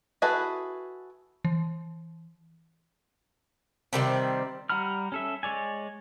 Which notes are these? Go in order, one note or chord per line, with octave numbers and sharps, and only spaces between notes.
E4 F#4 G#4 A4 B4
E3
C3 D#3 G3 C4
G3 F#5 A#5 B5 F6
C#4 A4 E5
G#3 C#5 D5 G#5